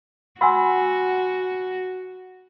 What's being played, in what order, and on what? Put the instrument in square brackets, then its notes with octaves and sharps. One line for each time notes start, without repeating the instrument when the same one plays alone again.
[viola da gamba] F#4 [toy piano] F#5 C6 E6 [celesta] G#5 B5